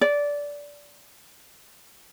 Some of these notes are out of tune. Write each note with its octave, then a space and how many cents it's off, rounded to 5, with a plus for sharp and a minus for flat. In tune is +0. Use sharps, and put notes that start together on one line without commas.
D5 -15